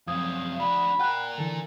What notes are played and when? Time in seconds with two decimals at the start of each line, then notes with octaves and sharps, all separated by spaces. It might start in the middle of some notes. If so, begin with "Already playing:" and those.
0.07 F#2 C3 F3 F5 D#6 G#6
0.60 D4 F#4 B5
0.99 F4 A#4 F#5 G5 F#6
1.38 D3 E3 A4